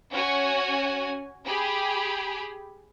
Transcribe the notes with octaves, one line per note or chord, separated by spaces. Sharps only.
C#4 F#4 C#5 G#5
G4 G#4 B5